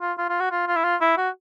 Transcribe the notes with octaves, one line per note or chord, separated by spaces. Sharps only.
F4
F4
F4
F#4
F4
F4
E4
F4
E4
F#4